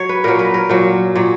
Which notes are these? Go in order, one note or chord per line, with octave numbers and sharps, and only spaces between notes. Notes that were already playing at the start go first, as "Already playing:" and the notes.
Already playing: F#3 C#5
B4
A#2 F#3 A#4
B4
A#4
A#2 F#3
A#2 F#3